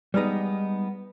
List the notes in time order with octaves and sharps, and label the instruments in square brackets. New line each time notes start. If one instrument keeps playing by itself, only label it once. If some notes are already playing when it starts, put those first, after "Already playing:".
[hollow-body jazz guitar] G3 G#3 B3 D#4